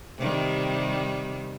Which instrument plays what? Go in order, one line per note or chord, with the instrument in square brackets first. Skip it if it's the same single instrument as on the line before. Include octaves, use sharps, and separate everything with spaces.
[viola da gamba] C3 D#3 G3